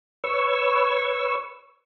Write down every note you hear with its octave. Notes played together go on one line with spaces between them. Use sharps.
B4 C#5 C#6 E6